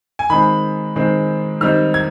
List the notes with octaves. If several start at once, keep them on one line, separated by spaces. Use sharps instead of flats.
G#5
D#3 G#3 C4 B5
D#3 G#3 C4
D#3 G3 C4 D#4 F6
G#6